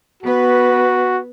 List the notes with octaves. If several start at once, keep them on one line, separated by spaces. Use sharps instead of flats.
B3 F#4 B4